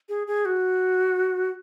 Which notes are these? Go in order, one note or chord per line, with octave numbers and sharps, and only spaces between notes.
G#4
G#4
F#4